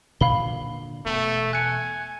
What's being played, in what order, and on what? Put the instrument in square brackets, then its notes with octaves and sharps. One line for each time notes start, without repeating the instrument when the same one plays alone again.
[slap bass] A#2 D3 D4 [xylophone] F5 B5 G7
[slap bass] E1 B3 [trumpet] A3
[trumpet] G#5 [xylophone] F#6 C#7